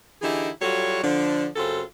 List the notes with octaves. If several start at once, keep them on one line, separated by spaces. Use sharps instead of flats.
D3 E3 D#4 E4 G4 G#4
F#3 G3 F4 F#4 A4 C#5
D3 F3 D4
F#2 C#3 C4 F4 F#4 A4